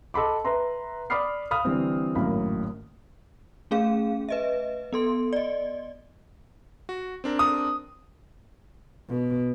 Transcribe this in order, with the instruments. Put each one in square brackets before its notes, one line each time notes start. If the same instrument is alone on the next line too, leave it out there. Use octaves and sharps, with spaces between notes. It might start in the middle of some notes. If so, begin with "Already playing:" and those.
[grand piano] A4 D#5 F#5 B5 C6 D6
B4 E5 A#5 C6
D5 B5 D6 D#6 F6 C7
F5 B5 D#6 F6
D3 E3 G3 C4
G#1 F#2 A2 A#3 B5
[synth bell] A3 C#4 G#4 F5
B4 D#5 E5
B3 A4 C6
D5 D#5
[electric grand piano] F#4
C4 D4 A#4
[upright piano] D#6
[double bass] B2